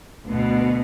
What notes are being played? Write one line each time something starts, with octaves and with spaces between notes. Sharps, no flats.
D2 B2